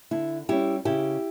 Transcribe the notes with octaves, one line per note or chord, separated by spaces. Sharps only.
D3 E4
G3 C#4 E4 G4
C#3 E4 G4